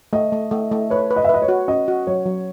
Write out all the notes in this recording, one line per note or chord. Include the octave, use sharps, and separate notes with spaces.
A3 D#5
A3
A3
A3
B4 C#5
B4
D#5
E5
B4 D#5
C#5
F#4
C#4 D#5
F#4
F#3 C#5
F#3